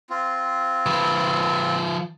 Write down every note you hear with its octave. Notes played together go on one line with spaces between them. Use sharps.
C4 F4
F3 B4